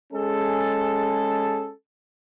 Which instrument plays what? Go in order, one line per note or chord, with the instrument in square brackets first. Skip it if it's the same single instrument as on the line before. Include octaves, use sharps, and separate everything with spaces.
[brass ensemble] G#3 C#4 G#4 A4